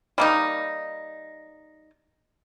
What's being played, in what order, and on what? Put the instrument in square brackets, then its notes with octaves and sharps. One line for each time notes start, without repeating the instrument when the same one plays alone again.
[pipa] G3 A#3 D#4